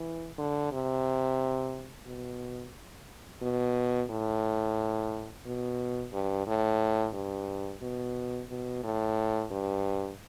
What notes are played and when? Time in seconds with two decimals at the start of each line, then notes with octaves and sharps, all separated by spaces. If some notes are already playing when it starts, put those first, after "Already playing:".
Already playing: E3
0.38 D3
0.72 C3
2.06 B2
3.42 B2
4.10 A2
5.46 B2
6.13 G2
6.47 A2
7.14 G2
7.82 B2
8.49 B2
8.84 A2
9.51 G2